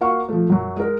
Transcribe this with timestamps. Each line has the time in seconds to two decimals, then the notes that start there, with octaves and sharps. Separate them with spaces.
0.01 A#3 F#4 F5 C#6
0.29 F3 A3
0.50 F#2 F#3
0.76 G#3 A#4